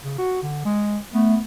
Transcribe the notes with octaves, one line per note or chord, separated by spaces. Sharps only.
C#3
F#4
D3
G#3
A3 B3